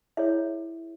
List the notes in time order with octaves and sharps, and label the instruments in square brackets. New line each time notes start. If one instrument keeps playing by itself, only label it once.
[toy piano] E4 G#4 C#5 E5